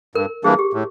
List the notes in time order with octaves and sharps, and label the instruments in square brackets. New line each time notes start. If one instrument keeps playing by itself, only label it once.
[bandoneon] G2 [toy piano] A#4
[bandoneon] E3 G3 A#3 D4 [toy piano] G#4
[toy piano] G4
[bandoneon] A2